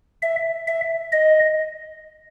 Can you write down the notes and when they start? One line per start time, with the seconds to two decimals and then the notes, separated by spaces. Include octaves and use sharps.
0.22 E5
0.67 E5
1.12 D#5